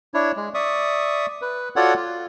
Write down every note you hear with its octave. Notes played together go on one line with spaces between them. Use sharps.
D4 E4 C#5
G#3
D5 E5 C#6 D#6
B4
F4 F#4 A4 C#5 D5 F#5
F4